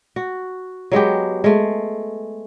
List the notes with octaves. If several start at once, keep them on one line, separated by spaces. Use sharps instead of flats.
F#4
F#3 G#3 B3 G4
G#3 A3